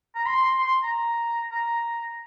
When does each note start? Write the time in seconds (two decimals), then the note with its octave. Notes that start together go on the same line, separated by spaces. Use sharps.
0.15 A#5
0.26 C6
0.38 C6
0.49 C6
0.61 C6
0.83 A#5
1.52 A#5